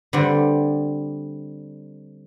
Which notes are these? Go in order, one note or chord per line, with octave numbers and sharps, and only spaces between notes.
D3 G3 C4